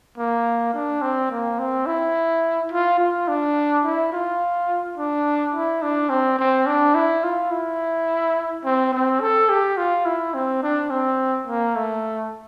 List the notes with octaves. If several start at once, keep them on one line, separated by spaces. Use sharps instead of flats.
A#3
D4
C4
A#3
C4
E4
F4
F4
D4
E4
F4
D4
E4
D4
C4
C4
D4
E4
F4
E4
C4
C4
A4
G4
F4
E4
C4
D4
C4
A#3
A3